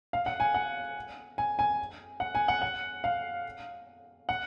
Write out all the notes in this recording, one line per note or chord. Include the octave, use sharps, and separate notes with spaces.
F5
F#5
G#5
F#5
G#5
G#5
F#5
G#5
F#5
F#5
F5
F#5